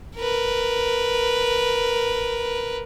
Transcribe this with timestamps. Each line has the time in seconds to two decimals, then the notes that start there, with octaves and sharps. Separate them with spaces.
0.17 A#4 B4